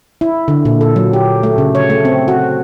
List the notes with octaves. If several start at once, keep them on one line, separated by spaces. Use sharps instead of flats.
E4
D3
A#2
A4
F#3
G4
A3
C#3
C#5
A3
C4
F#4